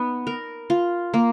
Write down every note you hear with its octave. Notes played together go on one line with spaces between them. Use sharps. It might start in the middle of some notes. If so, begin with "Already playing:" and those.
Already playing: B3 D#4
A#4
F4
A#3